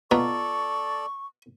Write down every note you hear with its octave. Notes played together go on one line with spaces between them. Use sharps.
B2 B3 F4 A4 D5 A#5 C#6